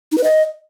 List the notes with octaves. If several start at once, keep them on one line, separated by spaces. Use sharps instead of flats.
D#4
B4
D#5